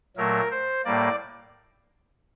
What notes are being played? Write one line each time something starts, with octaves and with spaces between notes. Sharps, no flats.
A#2 F#3 A3 A#4
C5
A2 G3 A#3 D5